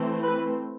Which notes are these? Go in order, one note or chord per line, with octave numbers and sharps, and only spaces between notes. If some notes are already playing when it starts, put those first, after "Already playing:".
Already playing: E3 A3 C4
B4